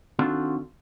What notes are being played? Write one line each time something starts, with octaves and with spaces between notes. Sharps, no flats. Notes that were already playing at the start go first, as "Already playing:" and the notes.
D#3 C4 D4 F4 F#4 A4